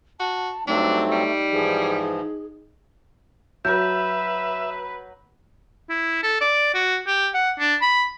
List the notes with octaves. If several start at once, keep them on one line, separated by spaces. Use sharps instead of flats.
F#4 A5
G2 F#3 A3 C4 D4 D#4
G3
G#2 E3 F3 G#4
F#3 B4 E5 G6
E4
A4
D5
F#4
G4
F#5
D4
B5